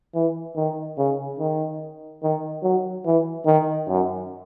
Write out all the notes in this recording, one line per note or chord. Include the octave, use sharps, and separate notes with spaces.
E3
D#3
C#3
D#3
D#3
F#3
E3
D#3
F#2